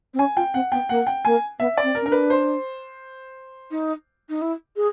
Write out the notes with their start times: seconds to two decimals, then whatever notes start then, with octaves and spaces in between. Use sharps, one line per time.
0.14 C4
0.19 C#4 G#5
0.36 F4 G5
0.54 C4 F#5
0.72 B3 G5
0.89 A#3 F#5
1.07 G5
1.25 A#3 G#5
1.59 B3 E5
1.77 D5
1.83 C4
1.95 A#4
2.01 C#4
2.06 D4 A#4
2.12 B4
2.30 C5
3.71 D#4
4.29 D#4
4.41 E4
4.76 G#4